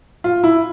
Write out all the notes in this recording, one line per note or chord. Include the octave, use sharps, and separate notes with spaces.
F4
E4